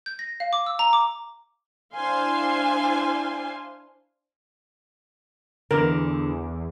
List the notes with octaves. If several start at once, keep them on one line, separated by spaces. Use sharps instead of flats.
G6
A#6
F5
D6
E6
A#5
D6
D4 E4 C5 F5 G#5 C6
E2 D3 B3 A#4 D6